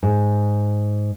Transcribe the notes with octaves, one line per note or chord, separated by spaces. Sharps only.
G#2